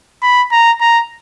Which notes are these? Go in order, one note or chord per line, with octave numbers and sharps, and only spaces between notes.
B5
A#5
A#5